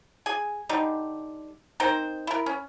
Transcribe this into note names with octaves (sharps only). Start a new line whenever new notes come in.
G#4 G#5
D3 G3 D#4
C4 D#4 A#4 C5
E4 A#4
C#4